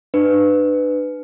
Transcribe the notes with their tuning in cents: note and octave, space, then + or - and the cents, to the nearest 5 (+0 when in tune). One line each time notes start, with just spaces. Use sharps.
D4 +40 B4 +15